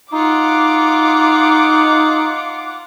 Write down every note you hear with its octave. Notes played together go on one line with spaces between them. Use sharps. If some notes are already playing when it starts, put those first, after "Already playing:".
D#4 F4 F#5 D6